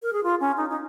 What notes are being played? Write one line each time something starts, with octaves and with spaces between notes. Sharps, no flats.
A#4
G#4
F4
C#4
D#4
D#4